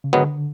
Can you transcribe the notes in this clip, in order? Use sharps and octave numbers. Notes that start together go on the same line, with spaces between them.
C#3
G#2 D3 D#3 F#3 B3